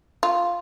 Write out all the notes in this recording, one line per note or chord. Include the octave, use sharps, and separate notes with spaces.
F4